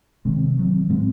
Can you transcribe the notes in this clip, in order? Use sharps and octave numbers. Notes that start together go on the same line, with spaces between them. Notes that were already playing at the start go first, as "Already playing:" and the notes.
C3 D#3 G#3 C4
D#3 F#3 C4
A2 G#3 C4